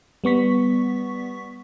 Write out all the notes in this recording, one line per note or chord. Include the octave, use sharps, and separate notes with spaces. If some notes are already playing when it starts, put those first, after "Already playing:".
G3 B3 C#6 B6